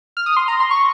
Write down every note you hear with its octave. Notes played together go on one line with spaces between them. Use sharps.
F6
D#6
C6
A#5
C6
C#6